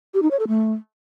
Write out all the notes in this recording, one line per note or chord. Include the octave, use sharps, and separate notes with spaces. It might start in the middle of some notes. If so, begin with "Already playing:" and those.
G4
D#4
C#5
A4
A3